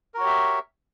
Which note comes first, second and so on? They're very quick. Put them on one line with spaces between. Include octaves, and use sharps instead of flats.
A#4 F#4 C#5 G4 E5